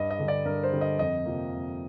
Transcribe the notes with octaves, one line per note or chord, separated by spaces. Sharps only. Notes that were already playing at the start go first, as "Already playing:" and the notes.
Already playing: G2 D#5
D#5
D3 G3
D5
G2 A#4
C5
D3 G3
D#5
F2 D#5
C3 F3 A#3
F2